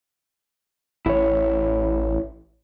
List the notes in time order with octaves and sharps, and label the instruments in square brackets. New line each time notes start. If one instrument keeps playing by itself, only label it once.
[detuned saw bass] A1 [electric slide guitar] E4 C#5